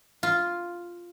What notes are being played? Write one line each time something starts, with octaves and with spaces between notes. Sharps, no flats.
F4